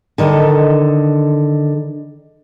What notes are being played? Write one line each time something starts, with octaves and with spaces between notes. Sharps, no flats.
D3 D#3 A4 D#5